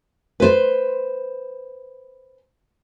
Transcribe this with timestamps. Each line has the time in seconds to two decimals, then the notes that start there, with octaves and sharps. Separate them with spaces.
0.40 B4 C5